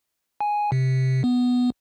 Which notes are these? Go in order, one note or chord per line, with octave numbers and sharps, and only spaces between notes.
G#5
C3
B3